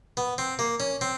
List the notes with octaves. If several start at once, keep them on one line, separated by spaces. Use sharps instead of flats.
B3
C4
A#3
C#4
C4